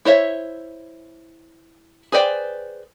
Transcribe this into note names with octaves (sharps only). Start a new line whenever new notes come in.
E4 C5 C#5 E5
G#4 B4 C5 D5 G5